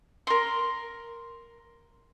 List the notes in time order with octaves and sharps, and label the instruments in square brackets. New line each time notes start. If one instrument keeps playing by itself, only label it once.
[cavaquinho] A#4 C6